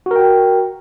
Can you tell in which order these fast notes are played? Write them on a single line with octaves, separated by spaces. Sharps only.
F#4 A#4 G5